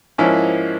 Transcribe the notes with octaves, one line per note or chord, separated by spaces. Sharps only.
G#2 F3 A#3 C#4 E4